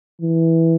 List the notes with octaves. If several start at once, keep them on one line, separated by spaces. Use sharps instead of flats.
E3